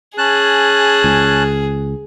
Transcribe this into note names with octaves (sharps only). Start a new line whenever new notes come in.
C#4 G#4 A5 F#6
C#2